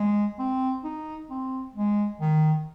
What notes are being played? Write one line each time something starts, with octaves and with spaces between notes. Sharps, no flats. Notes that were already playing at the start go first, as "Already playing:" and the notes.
Already playing: G#3
C4
D#4
C4
G#3
D#3